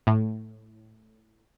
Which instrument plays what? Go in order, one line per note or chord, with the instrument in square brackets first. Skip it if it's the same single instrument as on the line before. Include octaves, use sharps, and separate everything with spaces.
[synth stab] A2